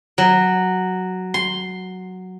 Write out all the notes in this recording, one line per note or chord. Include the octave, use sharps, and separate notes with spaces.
F#3
C6